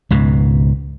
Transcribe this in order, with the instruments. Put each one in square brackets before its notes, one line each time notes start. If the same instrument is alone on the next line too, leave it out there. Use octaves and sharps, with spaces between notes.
[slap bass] C#2 G#2 B2